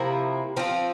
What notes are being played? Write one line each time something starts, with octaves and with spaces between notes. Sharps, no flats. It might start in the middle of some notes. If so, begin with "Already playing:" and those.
Already playing: C3 F3 A#3 E4
F3 C4 F4